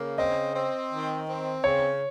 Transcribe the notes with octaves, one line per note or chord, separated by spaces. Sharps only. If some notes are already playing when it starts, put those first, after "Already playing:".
Already playing: C#3 A#3
C4 D#5
C4
D#3
C4
C#3 C#5